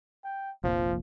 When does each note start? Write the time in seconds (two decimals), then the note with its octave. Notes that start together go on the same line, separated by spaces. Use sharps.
0.24 G5
0.64 F1 A#1 A#2 F3